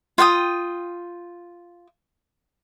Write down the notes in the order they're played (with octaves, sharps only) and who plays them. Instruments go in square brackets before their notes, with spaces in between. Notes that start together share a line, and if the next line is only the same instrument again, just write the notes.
[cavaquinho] F4 F5 G5 D#6